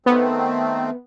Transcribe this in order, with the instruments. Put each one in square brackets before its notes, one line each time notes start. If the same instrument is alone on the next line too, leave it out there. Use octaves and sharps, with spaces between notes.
[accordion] D#3 A3 C4 [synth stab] B3